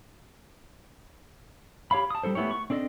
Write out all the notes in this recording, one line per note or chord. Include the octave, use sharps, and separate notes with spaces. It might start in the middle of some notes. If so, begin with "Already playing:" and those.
G4 C#5 F5 B5
A5 D#6
G3 E4 A4 C5
A3 B3 E4 G4 C#5
C#6
C4 D4 A4 D5 D#5